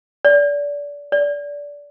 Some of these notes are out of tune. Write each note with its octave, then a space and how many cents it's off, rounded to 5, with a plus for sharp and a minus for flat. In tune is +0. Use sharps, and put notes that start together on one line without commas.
D5 -25
D5 -20